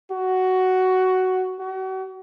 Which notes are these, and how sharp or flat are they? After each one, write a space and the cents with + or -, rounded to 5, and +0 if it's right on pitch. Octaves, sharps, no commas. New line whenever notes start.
F#4 +10
F#4 +40